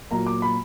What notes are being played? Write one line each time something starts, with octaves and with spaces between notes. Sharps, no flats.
A#2 F#3 A#3 A#5
D6
B5